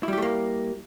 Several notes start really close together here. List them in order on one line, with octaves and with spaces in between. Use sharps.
E4 G3 G4 A3 A#3